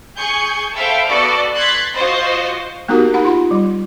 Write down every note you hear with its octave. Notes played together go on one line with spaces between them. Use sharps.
G#4 G#5 C#6 G6 C#7
A4 C5 E5 F5 G5 B5
B3 F#4 A4 D5
C6 F#6 G#6 A6 B6
F4 F#4 C5 D#5
A#3 B3 D#4 F#4 G4 A#4
D#4 G4 F#5 B5
F4 C6
G3